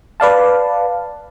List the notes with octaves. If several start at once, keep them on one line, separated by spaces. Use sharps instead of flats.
B4 D5 F5 A5